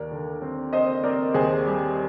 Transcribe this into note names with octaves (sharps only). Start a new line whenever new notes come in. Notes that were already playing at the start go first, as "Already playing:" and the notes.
Already playing: D#2 A#4 D5
D3
C4
C4 C5 D#5
C4 A#4 D5
D#2 G#4 C5
G3 G4